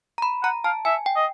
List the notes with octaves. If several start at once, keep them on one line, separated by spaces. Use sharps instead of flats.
A#5
B5
F#5 A#5
F5 A5
E5 G#5
G5
D#5